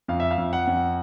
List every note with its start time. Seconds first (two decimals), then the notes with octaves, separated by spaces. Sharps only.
0.08 F2 F5
0.20 E5
0.31 F5
0.38 F2
0.53 F#5
0.67 F2